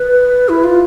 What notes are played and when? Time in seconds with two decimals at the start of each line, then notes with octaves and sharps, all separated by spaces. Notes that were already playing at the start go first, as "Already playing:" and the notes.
Already playing: B4
0.49 E4
0.64 F4